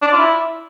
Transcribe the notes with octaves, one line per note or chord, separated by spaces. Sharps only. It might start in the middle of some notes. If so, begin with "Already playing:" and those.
D4
D5
F4
E4